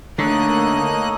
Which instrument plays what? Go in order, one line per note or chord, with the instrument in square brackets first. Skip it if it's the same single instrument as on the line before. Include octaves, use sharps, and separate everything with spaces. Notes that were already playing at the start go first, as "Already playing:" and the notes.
[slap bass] D3 [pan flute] A3 [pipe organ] A#3 D#5 F#6 [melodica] D#4 A4 C#5